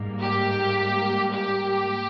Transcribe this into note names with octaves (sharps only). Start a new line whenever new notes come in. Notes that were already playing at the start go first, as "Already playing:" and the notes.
Already playing: G#2 G3 A#3
G4
G4